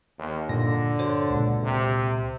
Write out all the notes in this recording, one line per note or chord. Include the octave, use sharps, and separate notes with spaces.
D#2
G2 A#2 D3 A#6
F#4 C5 C#5
C#2 A#2
C3